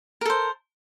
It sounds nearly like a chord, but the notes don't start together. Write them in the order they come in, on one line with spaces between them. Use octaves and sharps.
A#4 A4 C5